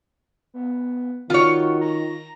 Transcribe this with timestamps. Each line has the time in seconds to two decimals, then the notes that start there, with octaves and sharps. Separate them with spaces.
0.54 B3
1.30 D#3 F4 F#4 C#5
1.82 A#5